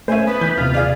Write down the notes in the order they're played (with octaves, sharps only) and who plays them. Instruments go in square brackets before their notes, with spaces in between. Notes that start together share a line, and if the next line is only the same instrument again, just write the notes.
[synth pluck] A3 C#4 [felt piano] C5 E5 [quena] G#5
[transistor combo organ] B3 [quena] B4
[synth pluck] E3 [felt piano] G6
[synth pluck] D#2 C3 [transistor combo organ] F4
[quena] G#4 [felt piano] D5 F5